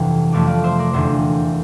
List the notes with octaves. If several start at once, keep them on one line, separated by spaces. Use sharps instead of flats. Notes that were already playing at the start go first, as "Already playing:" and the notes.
Already playing: G1 F2 C3 E3
F2 C3 F3 A3 C4 D5 F5
D5 F5
C5 E5
A#4 D5
F1 E2 D3 C5 E5